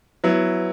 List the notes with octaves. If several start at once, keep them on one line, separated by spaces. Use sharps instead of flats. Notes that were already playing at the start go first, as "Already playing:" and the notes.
F#3 B3 E4